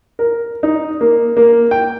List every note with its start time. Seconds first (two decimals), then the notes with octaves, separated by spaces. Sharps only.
0.19 A#4
0.63 D#4
1.01 A#3
1.37 A#3
1.71 G5